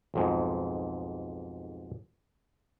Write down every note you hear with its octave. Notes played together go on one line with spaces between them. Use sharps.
B1 F2 G#2